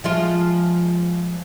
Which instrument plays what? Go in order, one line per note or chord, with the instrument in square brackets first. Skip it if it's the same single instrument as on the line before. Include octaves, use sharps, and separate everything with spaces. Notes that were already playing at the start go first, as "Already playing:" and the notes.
[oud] F3 G#3 F4